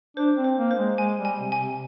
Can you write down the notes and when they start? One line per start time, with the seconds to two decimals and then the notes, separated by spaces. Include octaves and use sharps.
0.17 D4 C5
0.37 C4
0.44 C5
0.57 A#3
0.71 C5
0.78 G#3
0.98 G#3 G#5
1.18 G3
1.25 G#5
1.39 C3
1.52 G#5
1.59 C3